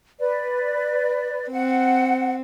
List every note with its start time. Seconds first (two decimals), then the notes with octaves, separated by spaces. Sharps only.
0.20 B4 D5
1.51 C4 F#5